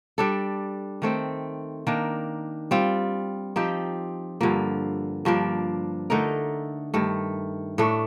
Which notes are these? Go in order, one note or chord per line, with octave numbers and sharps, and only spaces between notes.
G3 D4 A4
D#3 A3 C4
D#3 A#3 D4
G3 C4 F4
F3 C4 D#4 G4
G2 D3 F3 A#3
G2 F3 A#3 D4
D3 A3 D#4 A#4
G2 D#3 A3
A2 A3 D4